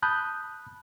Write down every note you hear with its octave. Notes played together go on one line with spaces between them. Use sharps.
A5 B5 D#6 F#6 G6